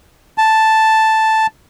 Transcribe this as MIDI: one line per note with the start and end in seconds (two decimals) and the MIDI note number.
0.38 1.47 81